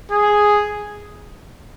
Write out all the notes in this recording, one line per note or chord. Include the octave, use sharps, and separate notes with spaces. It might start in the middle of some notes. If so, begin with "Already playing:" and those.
G#4